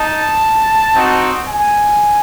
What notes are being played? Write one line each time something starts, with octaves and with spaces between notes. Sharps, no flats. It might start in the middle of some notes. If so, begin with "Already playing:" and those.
Already playing: D#4 A5
C4 D#4 F#4
G#5